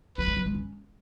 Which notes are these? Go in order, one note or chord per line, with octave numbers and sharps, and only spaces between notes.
F#3 B4
G#3
F#3
G#3
C#4